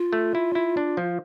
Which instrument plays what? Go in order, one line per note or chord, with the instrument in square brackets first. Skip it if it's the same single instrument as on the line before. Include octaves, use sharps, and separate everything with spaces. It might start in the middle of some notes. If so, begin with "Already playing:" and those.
Already playing: [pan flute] F4
[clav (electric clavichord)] A3
E4
E4
D4
F3